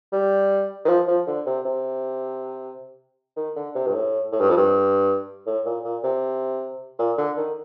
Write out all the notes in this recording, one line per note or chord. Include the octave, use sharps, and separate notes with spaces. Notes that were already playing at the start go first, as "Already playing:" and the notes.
G3
D#3
F3
F3
D3
C3
C3
D#3
D3
C3
G2
A2
A2
G2
F2
G2
A2
A#2
A#2
C3
A#2
D3
D#3